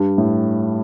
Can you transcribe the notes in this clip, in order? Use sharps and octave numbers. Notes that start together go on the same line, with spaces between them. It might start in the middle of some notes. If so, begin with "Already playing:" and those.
Already playing: G2
A2